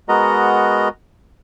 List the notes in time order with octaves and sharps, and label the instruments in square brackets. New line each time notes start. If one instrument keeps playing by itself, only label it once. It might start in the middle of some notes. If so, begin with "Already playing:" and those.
[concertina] G#3 B3 F#4 A#4 D#5 A#5